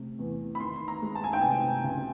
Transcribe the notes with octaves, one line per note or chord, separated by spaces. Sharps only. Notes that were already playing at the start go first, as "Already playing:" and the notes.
Already playing: C3 A3
E2
B5
D#3 C6
A#5
G#3
A5
G#5
G5
C3 G#5
C#2